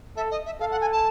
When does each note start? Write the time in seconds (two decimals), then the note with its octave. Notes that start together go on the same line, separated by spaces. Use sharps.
0.17 A4 E5
0.31 D#5
0.46 E5
0.60 A4 F5
0.71 F#5
0.81 G#5
0.92 A5